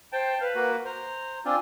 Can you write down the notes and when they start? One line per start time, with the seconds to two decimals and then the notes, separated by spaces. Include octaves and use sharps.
0.12 C5 G5 A5
0.40 B4 F5
0.55 A#3 F#4
0.85 C5 A#5
1.45 C4 D4 F4 G#5